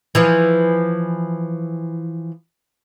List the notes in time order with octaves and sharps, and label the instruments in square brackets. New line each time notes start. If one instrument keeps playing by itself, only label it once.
[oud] E3 F3